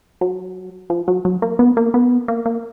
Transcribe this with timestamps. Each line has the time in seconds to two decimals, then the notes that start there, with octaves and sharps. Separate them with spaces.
0.21 F#3
0.90 F3
1.08 F#3
1.25 F#3
1.42 A#3
1.59 B3
1.77 A#3
1.94 B3
2.28 A#3
2.46 A#3